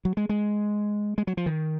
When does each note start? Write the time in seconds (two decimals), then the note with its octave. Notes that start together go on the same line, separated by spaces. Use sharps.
0.05 F#3
0.17 G#3
0.29 G#3
1.18 G#3
1.27 F#3
1.37 F3
1.46 D#3